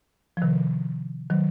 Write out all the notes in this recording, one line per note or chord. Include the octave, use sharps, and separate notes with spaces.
F3
C3 D#3
D#3 F#3